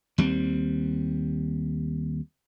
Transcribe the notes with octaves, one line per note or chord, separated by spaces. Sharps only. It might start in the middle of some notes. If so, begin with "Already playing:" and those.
D#2 G3 G#3 C4